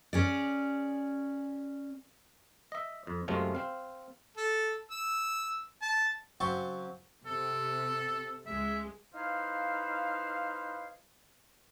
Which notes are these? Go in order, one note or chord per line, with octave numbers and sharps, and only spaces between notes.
C#4 G#4 D5
D#5 E5
F2
F#2 C3 G#3 A3 C#4 F4
C4 F5
A4
E6
A5
C#3 F#3 C4 A5 C6 C#6
C3 A4
C#2 G#3 E5
D#4 E4 B4 C5 F5